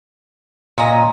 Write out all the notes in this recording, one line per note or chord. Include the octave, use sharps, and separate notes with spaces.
A#2 C#4 D#5 A#5